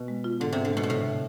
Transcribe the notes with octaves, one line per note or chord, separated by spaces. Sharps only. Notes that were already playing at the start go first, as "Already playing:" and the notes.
Already playing: B2
G#3
F4
G#2 D3
C3 D4
D3
B2 G#3
B2
A2 C3